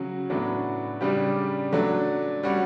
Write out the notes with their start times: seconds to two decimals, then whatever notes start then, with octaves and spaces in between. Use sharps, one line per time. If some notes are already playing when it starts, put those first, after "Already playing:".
Already playing: C#3 F#3 C#4 F#4
0.30 A2 F#3 B3 D4 F#4
1.01 C#3 G3 D4 G4
1.72 F#3 A3 D4
2.43 G3 C#4 F#4